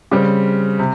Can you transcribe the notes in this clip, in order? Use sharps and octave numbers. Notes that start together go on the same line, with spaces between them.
C#3 G3 C4
C3